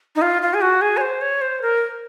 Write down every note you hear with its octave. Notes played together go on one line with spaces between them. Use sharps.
D#4
F4
F4
G#4
F#4
G#4
C#5
C5
C#5
C5
A#4